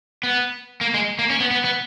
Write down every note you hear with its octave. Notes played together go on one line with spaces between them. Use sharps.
B3
A#3
G#3
A#3
C#4
B3
B3
B3